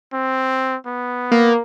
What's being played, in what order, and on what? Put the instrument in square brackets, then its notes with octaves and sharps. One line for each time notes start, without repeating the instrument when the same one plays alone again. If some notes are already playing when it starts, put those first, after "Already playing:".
[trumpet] C4
B3
[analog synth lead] A#3